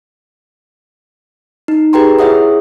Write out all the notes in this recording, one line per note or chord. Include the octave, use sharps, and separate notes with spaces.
D#4
G4 G#4 B4 G5 A#5 C6
E4 G#4 C#5 E5 F#5 D#6